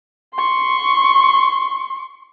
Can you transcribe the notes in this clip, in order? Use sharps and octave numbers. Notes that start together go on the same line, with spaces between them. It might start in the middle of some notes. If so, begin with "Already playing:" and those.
C6 C#6